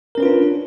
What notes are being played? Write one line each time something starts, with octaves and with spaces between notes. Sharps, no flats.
C#4 D4 F4 A#4 B4